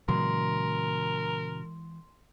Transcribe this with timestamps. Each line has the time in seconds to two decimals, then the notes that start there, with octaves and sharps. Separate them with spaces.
0.08 A#2 C#3 E3 F#3 G#3 A#4 C6